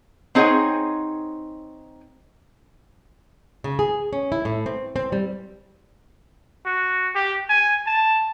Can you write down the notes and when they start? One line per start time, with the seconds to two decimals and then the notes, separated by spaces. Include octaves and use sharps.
0.35 C4 D#4 G#4 C#5 F#5 G#5
3.64 C#3
3.79 G#4
4.13 C#4
4.32 E4
4.45 A2
4.66 C4
4.96 C4
5.12 G3
6.66 F#4
7.15 G4
7.49 G#5
7.87 A5